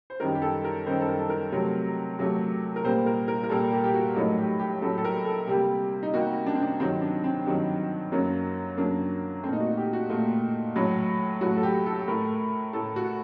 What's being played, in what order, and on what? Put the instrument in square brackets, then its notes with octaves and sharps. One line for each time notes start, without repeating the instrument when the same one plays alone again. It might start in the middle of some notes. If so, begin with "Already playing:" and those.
[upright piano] C5
F#2 D#3 G3 A#4
G4
A4
A#4
F#2 D#3 G3 C5
A4
A#4
A4
A#4
C3 F#3 A3
C3 F#3 A3
A#4
A#2 G3 A#3 C5
A#4
A#4
A#4
A#2 G3 A#3 A4
G4
G4
F#4
A2 F#3 A3 D#4
G4
G4
A2 F#3 A3 A4
A4
A#4
A4
C3 G3 A#3 G4
D#4
C3 G3 A#3 F#4
D4
C4
D4
G2 D#3 F#3 C4
D4
C4
G2 D#3 F#3
F#2 F#3 A#3
F#2 F#3 A#3 D4
A3 C4
A#2 D#4
F#4
G4
F#4
A#2 A3
A2 F#3 A3
A2 F#3 A3 F#4
A4
G4
A4
A2 A3 A#4
A2 A3 A4
F#4